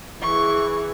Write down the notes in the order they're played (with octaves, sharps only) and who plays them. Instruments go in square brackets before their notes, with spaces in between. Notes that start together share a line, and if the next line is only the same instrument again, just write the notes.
[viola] E3 G#4 [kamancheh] C#6